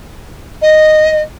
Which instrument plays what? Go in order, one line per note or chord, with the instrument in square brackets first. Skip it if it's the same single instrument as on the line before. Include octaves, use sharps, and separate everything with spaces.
[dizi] D#5